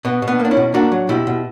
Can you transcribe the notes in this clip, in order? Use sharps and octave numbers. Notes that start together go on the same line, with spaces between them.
B2 B3
B2
B3 D4
A#3
D4
C#4 E4
B2
A#3 D4 F#4
F#3
B2 E4 G4
B2